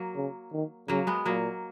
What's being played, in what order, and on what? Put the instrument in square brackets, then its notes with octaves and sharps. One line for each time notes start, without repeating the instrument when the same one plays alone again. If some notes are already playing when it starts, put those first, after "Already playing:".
Already playing: [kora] F#3 A#3
[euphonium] C#3
D#3
[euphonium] C#3 [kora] F#3 A#3
[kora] G#3 B3
[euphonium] A#2 [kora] F#3 A#3